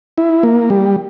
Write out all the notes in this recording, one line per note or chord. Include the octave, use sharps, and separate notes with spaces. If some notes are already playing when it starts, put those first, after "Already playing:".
E4
A#3
G3